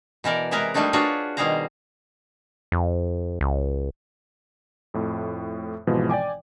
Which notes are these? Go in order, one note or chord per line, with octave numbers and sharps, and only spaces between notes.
B2 E3 A#4 D5
C3 G#3 E4 A#4 B4 A#5
F3 G3 A3 A#3 D4 D#4
D4 F4 F#4 G#4 B4 C#5
B2 D#3 G3 G#4 C5 A#5
F2
C#2
F2 A2
G#1 B2 E3 F3 G#3
D5 G5 G#5 D6